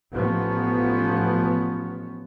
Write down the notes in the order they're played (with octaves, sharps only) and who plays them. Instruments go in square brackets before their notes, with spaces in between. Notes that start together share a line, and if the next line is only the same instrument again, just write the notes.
[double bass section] A1 F3 B3 C#4